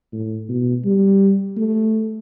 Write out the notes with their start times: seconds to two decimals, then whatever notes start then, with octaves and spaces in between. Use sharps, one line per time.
0.12 A2
0.49 B2
0.85 G3
1.57 A3